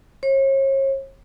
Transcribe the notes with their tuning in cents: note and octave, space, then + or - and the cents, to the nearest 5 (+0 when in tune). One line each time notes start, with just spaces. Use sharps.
C#5 -40